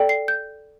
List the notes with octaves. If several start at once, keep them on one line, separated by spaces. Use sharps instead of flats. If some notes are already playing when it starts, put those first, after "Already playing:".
Already playing: A4 D5 G5
C7
G6